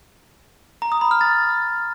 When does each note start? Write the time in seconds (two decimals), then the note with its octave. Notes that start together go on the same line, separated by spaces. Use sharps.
0.82 A#5
0.92 D#6
1.01 B5
1.11 F6
1.21 A6